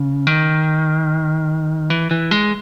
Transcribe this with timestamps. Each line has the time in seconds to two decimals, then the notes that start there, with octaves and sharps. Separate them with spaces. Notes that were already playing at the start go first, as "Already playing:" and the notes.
Already playing: C#3
0.27 D#3
1.90 E3
2.11 E3
2.31 G#3